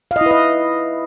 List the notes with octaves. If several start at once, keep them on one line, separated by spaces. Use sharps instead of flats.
F5
D#5
E4
B4
D#5